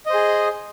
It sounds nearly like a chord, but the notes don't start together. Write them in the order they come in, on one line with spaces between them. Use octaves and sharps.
D#5 C5 G#4